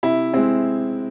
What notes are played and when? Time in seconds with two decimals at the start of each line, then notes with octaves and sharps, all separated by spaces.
0.03 C3 E4
0.33 G#3 C4 E4